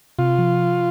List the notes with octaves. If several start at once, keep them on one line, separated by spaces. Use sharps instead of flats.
C3 F4
F3